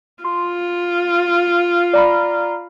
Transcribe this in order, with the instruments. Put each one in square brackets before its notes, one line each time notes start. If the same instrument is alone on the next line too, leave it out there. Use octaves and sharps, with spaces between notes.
[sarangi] F4 [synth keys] C6
[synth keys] D5 A#5 B5